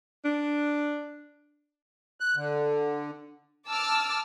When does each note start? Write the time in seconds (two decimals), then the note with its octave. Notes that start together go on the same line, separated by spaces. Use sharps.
0.25 D4
2.20 F#6
2.36 D3
3.67 A5 D6 E6 F6